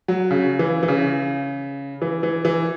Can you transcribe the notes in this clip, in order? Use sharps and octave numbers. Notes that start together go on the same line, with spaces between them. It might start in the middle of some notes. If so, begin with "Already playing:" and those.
F#3
C#3
E3
E3
C#3
E3
E3
E3